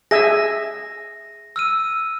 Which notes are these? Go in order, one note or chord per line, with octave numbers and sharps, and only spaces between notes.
G#4 E5 G#5 A#6
E6 F6 D#7